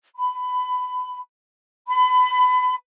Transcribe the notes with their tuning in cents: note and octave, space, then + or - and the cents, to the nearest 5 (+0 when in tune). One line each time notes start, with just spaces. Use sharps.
B5 +20
B5 +30